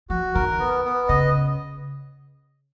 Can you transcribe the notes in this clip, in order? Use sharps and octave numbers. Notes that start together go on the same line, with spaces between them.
F3 F#4
D#3 A#4
B3
B3
C#3 D#5